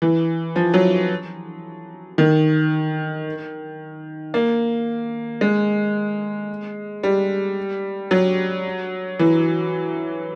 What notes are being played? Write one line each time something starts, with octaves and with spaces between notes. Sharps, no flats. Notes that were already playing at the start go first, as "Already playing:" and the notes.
E3
F3
F#3
D#3
A#3
G#3
G3
F#3
E3